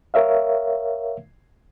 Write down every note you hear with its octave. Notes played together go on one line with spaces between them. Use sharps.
A#4 C#5 E5 F5